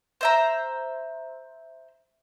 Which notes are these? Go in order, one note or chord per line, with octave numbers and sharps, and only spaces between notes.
C5 E5 A#5